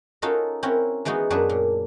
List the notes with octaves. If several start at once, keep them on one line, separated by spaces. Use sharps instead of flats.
C#4 D#4 F4 F#4 A4 A#4
C4 C#4 E4 F#4 A#4
E3 G#3 B3 D#4 F#4
F#2 F#3 D4 G#4 B4
A#2